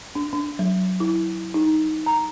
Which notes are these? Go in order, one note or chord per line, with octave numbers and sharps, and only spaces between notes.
D4
D4
F#3
E4
D#4
A#5